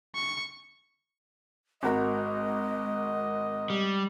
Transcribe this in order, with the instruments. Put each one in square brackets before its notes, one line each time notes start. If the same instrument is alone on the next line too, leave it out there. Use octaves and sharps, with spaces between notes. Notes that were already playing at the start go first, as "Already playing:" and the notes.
[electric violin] C#6
[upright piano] G#1 F#4 A#4 [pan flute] G#3 [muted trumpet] D#5
[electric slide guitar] G3